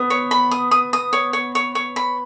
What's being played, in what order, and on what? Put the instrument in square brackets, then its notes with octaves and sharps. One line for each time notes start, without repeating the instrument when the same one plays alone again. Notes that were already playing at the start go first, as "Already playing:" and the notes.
Already playing: [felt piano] B3 [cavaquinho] D#6
[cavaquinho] C#5
B5
D#6
D#6
D#6
C#5
C#5
C#5
C#5
B5